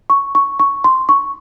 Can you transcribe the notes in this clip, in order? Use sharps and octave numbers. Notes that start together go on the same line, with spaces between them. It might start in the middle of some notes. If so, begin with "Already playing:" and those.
C#6
C#6
C#6
C6
C#6